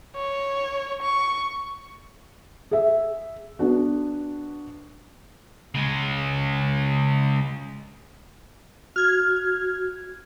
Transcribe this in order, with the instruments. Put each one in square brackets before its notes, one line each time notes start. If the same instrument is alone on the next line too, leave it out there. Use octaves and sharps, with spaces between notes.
[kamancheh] C#5
C#6
[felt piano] G#4 E5
B3 D4 F#4
[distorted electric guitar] C#3 G#3
[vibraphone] F#4 [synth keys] F6 G#6